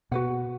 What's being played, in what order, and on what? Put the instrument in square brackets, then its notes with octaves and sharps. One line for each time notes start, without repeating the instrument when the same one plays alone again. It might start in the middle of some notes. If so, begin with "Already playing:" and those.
[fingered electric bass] B2 [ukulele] F#4 B4 F#5